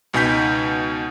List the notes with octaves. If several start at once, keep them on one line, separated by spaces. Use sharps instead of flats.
C#2 B2 D#4 G#5 G6 B6